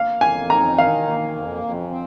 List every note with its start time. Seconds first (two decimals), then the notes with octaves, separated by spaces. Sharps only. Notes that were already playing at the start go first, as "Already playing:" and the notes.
Already playing: A#3 F5
0.21 F2 G#5
0.50 D#4 A#5
0.78 D#3 F5
1.07 A#3
1.35 F2
1.64 F2
1.91 C4